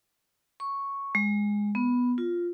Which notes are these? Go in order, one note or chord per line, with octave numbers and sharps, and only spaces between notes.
C#6
G#3
B3
F4